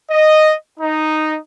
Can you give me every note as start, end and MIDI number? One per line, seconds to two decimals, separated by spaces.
0.11 0.55 75
0.80 1.37 63